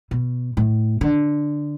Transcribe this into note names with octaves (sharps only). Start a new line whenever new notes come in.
B2
A2
D3